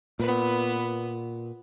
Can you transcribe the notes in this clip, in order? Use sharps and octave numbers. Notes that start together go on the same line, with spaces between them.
A#2 B3 B4